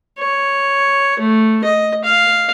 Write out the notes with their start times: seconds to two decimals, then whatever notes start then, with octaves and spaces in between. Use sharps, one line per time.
0.19 C#5
1.19 A3
1.64 D#5
2.04 F5